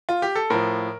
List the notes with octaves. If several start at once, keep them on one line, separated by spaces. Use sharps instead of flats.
F4
G4
A4
A2 F3 A#4